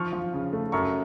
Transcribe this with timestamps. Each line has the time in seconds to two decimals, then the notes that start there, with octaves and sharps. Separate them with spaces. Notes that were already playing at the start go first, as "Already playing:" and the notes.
Already playing: F3 C#6 F6
0.12 F3
0.33 C#3
0.53 A3
0.72 F#2 A#5 C#6